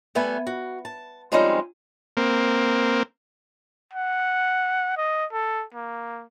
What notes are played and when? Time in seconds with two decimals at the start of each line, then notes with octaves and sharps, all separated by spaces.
0.15 G3 A3 B3 A4 B4 G#5
0.47 F#4
0.85 A5
1.32 F3 G3 G#3 C4 C#4 D#4
2.17 A#3 C4
3.93 F#5
4.97 D#5
5.32 A4
5.75 A#3